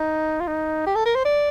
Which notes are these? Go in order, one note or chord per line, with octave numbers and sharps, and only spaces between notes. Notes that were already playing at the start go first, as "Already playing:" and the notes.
Already playing: D#4
F4
D#4
G4
A4
A#4
C5
D5